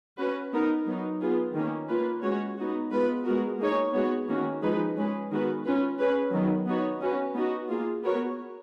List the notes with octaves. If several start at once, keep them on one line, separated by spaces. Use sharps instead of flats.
C#4 F#4 B4
B3 D#4 A#4
F#3 B3 D#4
B3 F4 G#4
D#3 A#3 C#4
A#3 F4 B4
G#3 C#4 F#4 C#5
B3 D#4 F#4
G#3 B3 F4 B4
G#3 B3 F#4 A#4
A#3 D#4 G#4 C#5
G#3 B3 F#4 C#5
D#3 A#3 C#4 F#4
F3 G#3 D#4 G#4 B4
G#3 C#4 G#4 B4
D#3 G#3 B3 F#4 B4
C#4 F4 B4
C#4 G#4 B4
D#3 F#3 B3
B3 D#4 F#4 C#5
C#4 F#4 B4
B3 D#4 F#4
A#3 F4 G#4
B3 F#4 A#4 C#5